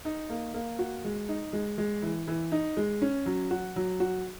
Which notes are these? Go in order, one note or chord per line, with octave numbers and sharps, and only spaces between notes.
D#4
A#3
A#3
F#4
G#3
D#4
G#3
G#3
E3
E3
D#4
G#3
C#4
F#3
F#4
F#3
F#4